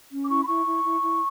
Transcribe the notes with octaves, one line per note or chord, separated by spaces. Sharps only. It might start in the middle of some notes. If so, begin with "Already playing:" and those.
C#4
D6
E4 C#6
B5
E4 C#6
E4
E4
E4